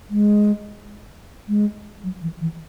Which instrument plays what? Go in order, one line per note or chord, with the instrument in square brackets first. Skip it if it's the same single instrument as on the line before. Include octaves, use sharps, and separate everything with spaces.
[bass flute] G#3
G#3
F#3
E3
E3